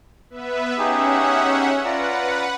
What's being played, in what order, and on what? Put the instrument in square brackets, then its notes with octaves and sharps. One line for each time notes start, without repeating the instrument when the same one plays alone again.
[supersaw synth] B3 B4 E5
[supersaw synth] C#4 E5 F#5 [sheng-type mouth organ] D#4 G4 G#4
[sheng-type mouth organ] F4 D5 A#5 [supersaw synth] B4 F#5